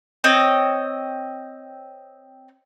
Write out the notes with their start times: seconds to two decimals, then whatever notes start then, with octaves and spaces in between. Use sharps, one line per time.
0.24 C4 C#5 D#5